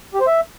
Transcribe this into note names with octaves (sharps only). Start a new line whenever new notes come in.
G4
C5
E5